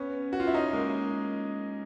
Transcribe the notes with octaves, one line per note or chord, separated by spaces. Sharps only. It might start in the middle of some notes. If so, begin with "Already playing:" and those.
Already playing: B3 C#4
F#4
F4
E4
C#4 D#4
G#3 A#3